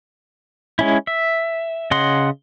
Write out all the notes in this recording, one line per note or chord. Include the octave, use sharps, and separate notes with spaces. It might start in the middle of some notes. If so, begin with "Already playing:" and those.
G#3 C#4 E4
E5
C#3 D#5 F#5 C6